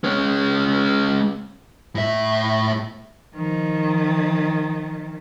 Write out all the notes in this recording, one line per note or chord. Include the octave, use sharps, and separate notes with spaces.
G#3 C#4
A2 E5
D#3 F3